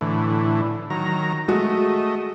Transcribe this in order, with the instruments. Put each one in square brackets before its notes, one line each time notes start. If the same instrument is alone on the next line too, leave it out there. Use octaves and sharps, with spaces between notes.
[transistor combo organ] A2 D3 E3
D#3 F#3 A#5
[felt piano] G#3 F#4 [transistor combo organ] A3 D#5